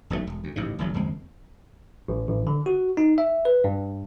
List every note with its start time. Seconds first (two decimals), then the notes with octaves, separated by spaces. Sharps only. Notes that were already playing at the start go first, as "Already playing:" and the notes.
0.10 E1 B1 A#2 A3
0.27 E1
0.44 D2
0.56 A1 G#2 C#3
0.79 D#1 A1 F#3
0.94 F#1 D#2 G#3 C4
2.08 A1
2.29 A1
2.47 D3
2.66 F#4
2.97 D#4
3.18 E5
3.45 B4
3.64 G2